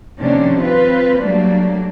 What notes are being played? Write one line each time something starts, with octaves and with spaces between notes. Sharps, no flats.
C3 D#3 F3 A#3 C#4 D4
C4 F4 B4
F#3 G3 A3 A#3 D4